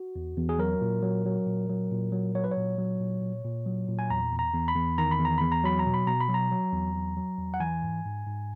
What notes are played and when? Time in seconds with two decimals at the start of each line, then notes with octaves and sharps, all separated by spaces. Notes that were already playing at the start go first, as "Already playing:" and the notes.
Already playing: F#4
0.16 E2
0.37 E2
0.49 G#4
0.59 F#3 A#4
0.81 A#2
1.03 F#3
1.25 F#3
1.47 A#2
1.69 F#3
1.91 A#2
2.12 F#3
2.35 F#3 C#5
2.44 B4
2.51 C#5
2.57 A#2
2.78 F#3
3.00 A#2
3.22 A#2
3.44 A#2
3.66 F#3
3.88 A#2
3.99 G#5
4.10 E2 A#5
4.32 E2
4.39 A#5
4.53 E2
4.68 B5
4.76 E2
4.98 D#3 A#5
5.11 B5
5.19 E2
5.25 A#5
5.38 E2 B5
5.52 A#5
5.64 F#3 B5
5.79 A#5
5.86 B2
5.94 B5
6.07 B2 A#5
6.21 B5
6.29 F#3
6.34 A#5
6.51 F#3
6.73 E2
6.94 F#3
7.16 F#3
7.38 E2
7.54 F#5
7.60 E3 G#5
7.82 G#2
8.05 G#2
8.27 G#2